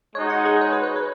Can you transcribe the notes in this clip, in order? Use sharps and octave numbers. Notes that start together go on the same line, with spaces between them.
G#3 D#4 F#4 C#5
F#5
G#4
C#5
B4
C#5
B4